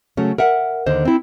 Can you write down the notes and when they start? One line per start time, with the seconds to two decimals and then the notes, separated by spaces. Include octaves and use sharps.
0.17 C#3 F#3 A3 C#4
0.38 A#4 E5 F#5
0.86 D#2 D3 C5 D#5
1.05 C4 E4